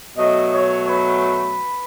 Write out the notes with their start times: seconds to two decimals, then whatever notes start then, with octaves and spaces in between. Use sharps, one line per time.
0.17 B2 F#3 A3 D#5
0.53 C#5
0.88 B4